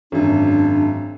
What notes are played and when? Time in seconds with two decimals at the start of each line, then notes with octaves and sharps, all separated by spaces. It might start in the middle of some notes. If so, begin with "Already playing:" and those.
0.12 G#1 F#2 D4